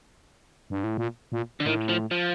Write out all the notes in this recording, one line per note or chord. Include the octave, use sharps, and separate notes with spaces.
G2
A2
A#2
A#2
D3
A2 D#3
F3
F3